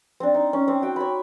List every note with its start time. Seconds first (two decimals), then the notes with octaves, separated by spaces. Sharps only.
0.20 C4 D4
0.34 D#4
0.53 C#4
0.68 C4
0.82 F#4 G5
0.96 C#5 B5